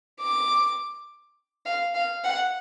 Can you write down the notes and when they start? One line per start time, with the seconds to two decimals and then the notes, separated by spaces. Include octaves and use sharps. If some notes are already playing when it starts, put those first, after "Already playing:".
0.20 D6
1.66 F5
1.95 F5
2.24 F#5